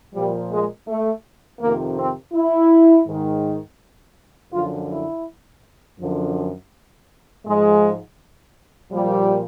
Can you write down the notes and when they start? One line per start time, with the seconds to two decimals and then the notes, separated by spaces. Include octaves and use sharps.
0.15 A#2 F3 G3
0.51 G#3
0.88 A3
1.61 F2 C3 D#3 A#3
1.97 C4
2.34 E4
3.07 G#2 D#3
4.53 F#2 D3 F3 F4
4.90 E4
5.99 F#2 D3 F3
7.45 G#2 F3 G#3
8.92 A#2 F3 G3